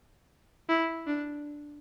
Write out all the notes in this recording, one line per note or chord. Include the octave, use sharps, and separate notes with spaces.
E4
D4